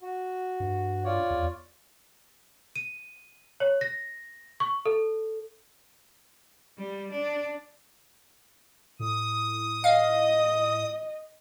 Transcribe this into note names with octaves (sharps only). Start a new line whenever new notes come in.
F#4
G2
F4 C#5 D5
E2
D#7
C#5
A#6
C#6
A4
G3
D4
A2 D#6
D#5 F5